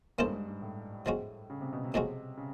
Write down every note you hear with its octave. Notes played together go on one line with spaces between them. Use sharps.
G#2 A#3 C#4 E4 A4 C5
G2
G#2
G#2
A2
F3 G#3 C#4 F#4
C#3
C3
B2
C3
A2 F3 G#3 C#4 F#4
C#3